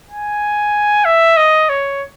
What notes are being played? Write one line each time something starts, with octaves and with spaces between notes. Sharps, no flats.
G#5
E5
D#5
C#5